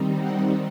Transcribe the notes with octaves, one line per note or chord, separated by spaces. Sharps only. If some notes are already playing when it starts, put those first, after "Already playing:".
Already playing: D#3 G3 C4 D#4
F#5